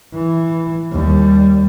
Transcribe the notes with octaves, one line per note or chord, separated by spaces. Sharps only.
E3
D#2 G3